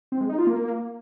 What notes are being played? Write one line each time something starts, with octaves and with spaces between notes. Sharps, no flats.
C4
G#3
D#4
F4
A#3